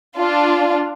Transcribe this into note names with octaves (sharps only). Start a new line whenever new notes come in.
D4 F4